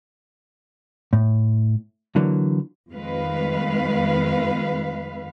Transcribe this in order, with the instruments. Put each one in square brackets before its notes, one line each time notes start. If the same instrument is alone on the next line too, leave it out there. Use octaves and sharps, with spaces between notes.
[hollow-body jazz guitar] A2
D3 E3 F#3 A#3
[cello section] F2 D#3 G#3 B4 F5